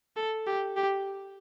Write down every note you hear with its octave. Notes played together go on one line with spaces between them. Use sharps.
A4
G4
G4